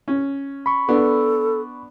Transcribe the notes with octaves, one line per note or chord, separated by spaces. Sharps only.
C#4
B5 C#6
B3 D4 A4